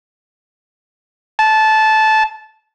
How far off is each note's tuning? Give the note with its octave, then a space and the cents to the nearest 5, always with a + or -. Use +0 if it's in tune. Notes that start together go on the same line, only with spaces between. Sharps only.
A5 -15